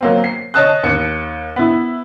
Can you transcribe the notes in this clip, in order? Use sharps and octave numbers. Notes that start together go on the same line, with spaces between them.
F#3 A#3 C4
C7
C#5 D#5 A5 D#6 F#6
D#2 C#7
B3 E4